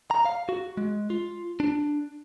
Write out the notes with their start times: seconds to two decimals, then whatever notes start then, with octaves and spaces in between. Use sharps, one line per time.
0.11 A#5
0.25 F5
0.49 F#4
0.77 G#3
1.10 F4
1.60 D4